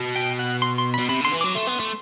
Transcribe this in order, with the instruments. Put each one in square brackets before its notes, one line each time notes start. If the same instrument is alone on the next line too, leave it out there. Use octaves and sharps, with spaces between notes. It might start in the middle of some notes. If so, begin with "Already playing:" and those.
Already playing: [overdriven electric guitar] B2
[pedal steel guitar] G5
F#5
C6
C6
[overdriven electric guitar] B2 [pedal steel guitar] B5
[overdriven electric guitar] C3 [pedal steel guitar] B5
[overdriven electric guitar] D3 [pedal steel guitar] C6
[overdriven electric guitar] E3
[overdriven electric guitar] F#3 [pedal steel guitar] D6
[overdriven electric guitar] A3 [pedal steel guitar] C6
[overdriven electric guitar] B3
A3